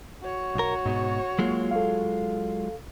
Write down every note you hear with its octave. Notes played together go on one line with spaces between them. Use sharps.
F#4 C#5
B1 A#4
G#2 B2
F#3 G#3 A#3 F4
A4 F5